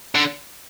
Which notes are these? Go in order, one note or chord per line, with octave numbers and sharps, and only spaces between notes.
D3